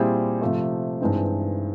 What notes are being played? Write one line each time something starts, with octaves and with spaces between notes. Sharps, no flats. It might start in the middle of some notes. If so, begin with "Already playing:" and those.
Already playing: A#2 G3 C4 E4 G#4
C3 F3 A3
G2 E3 G#3 C4 D#4